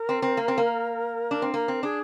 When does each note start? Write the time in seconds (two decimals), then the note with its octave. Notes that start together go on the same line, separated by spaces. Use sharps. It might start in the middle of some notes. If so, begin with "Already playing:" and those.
Already playing: A#4
0.09 C4
0.22 C4
0.37 A#3
0.48 C4
0.58 A#3
1.31 D4
1.42 C4
1.54 A#3 A#4
1.68 C4
1.83 D4 G#4